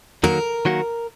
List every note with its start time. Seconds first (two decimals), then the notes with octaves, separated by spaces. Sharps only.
0.24 D#3 F#3 A#3 F#4 A#4
0.65 D#3 F#3 A#3 F#4